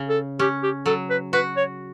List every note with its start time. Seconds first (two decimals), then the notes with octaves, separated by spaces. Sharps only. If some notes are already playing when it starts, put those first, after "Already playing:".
Already playing: C#3
0.09 A4
0.39 C#4 G4
0.63 G4
0.86 F#3 A4
1.10 B4
1.33 F#4 B4
1.56 C#5